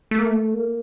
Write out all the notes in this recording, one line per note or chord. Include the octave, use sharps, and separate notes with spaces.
A3
A#3
A3
A#3